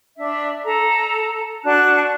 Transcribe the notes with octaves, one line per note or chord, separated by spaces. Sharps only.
D4 E5
A4 A#5
D4 F#4 A5 F#6